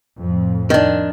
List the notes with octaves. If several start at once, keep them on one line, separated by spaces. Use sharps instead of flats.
F2 A2
D#3 D4